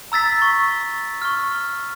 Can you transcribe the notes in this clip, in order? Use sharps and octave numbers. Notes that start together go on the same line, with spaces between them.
A#5 E6 A6 B6
C#6
C#6 F6